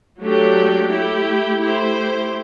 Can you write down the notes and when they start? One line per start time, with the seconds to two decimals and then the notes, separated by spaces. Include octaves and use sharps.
0.21 F#3 A3 D4 G4
0.90 A3 E4 G4
1.60 A3 E4 G4 C5